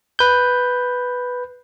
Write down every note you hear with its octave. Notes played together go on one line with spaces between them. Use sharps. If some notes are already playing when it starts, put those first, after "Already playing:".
B4 G6